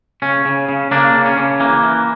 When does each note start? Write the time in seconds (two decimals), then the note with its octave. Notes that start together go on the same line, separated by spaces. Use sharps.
0.22 C#3 C#4
0.45 C#3
0.69 C#3
0.91 C#3 A#3 D4
1.14 C#3
1.25 C#4
1.37 C#3
1.60 E3 A#3
1.83 E3